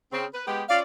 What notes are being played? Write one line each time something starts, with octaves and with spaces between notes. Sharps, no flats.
C#3 C4
B4
G#3 B3 G4
C#4 F4 D5 F5